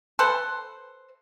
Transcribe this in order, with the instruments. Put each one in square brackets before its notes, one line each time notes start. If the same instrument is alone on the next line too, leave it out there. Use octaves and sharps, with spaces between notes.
[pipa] A4 B4 C5